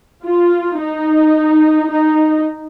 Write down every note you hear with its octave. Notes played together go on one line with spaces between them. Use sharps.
F4
D#4
D#4